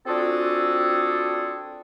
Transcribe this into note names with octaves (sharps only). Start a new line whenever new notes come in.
C4 D4 F4 F#4 G#4 A4